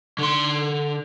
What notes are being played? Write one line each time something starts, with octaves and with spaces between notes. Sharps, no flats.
D3 C6